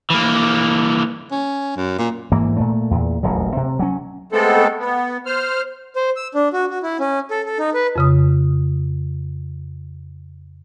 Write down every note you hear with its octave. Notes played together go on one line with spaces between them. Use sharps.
E3 A#3
C#4
F#2
A#2
G#2 E3 A#3
A#2 A3
E2 A#2
D#1 A1 F#3
C3
F#3 C#4
G#3 A3 B3 C4 A4
B3
C5 F6
C5
E6
D4
F#4
F#4
E4
C#4
A4
A4
D#4
B4
F2 C#3 D#6